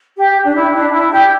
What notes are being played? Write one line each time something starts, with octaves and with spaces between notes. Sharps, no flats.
G4
D4
E4
D4
E4
G4